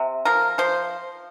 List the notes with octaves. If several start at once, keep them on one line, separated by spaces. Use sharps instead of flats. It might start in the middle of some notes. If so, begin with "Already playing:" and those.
Already playing: C3
F3 A#4
F3 C5